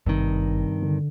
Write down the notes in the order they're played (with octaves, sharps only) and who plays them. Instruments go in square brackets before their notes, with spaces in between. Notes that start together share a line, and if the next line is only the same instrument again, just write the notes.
[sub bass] G#1 [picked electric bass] G2 C3 D#3
[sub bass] D3